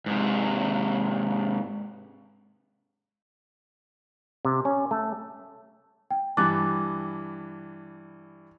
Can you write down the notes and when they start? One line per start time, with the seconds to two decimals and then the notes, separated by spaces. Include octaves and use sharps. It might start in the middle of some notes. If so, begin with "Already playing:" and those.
0.06 G#2 C3
4.45 C3
4.65 C#4
4.91 A3
6.11 G5
6.37 G2 E3 A5 D6 F#6 A6